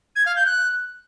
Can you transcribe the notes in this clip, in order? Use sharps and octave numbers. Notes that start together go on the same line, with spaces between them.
G#6
F5
G6
F#6